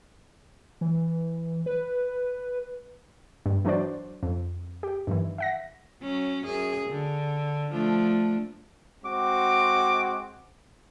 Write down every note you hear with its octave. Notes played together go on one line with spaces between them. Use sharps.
E3
B4
G2
E3 F#3 D4 F#4 C5 D5
F2
G4
G2 D#3 E3
E5 F#5 A#6
F#3 C#4
F#2 G#4
D3
F3 A3 D4
G#3 C4 F#4 D6